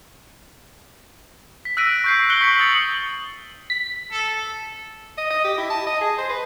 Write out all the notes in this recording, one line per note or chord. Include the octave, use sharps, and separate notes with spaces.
B6
E6 F#6 A#6 B6 D7 D#7
C#6 G6 C7
F#6 C#7 F#7 G7
C#6 B6 F#7
D#6 A6 C#7 F#7
B6
A4
D#5
D#5
G4
E4
A5
D#5
G#4
C5
B4